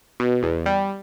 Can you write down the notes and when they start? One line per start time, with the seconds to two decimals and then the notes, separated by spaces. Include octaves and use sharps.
0.20 B2
0.43 E2
0.66 G3